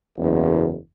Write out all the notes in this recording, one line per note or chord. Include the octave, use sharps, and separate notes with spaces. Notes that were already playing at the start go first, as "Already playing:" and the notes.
F#1 E2